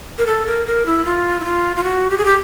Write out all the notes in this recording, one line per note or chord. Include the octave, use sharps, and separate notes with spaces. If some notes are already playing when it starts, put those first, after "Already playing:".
A#4
A4
A#4
A#4
E4
F4
E4
F4
F4
F#4
G4
G#4
G4